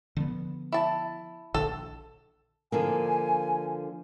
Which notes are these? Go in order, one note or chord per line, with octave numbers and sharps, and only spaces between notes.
D3 F3 B3
E4 A5
A#1 D3 A4
D3 F3 A#3 G#5